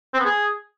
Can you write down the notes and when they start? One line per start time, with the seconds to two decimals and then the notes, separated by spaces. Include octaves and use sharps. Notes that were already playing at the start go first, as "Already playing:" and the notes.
0.14 C4
0.20 B3
0.25 G#4